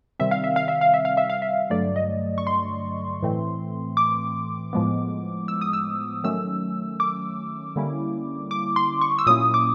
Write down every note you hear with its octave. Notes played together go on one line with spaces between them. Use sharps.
C3 D#3 G3 C4 E5
F5
E5
F5
E5
F5
E5
F5
E5
F5
E5
G2 D3 F#3 A3 D5
D#5
C#6
C6
A2 E3 A3 C4
D6
A2 F3 G#3 B3
E6
D#6
E6
D#3 F#3 A3 C#4 E6
D6
D3 G3 A#3 C#4 E4
D6
C6
C#6
E6
A#2 F#3 A#3 C#4 E4 D#6
D6